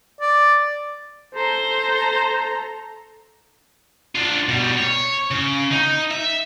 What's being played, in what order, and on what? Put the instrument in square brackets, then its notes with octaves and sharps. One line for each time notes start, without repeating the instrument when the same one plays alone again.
[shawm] D5
[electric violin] A4 A#5 [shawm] C5
[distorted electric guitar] D4 F4
B2 G3
C#5
C#3
D#4
E5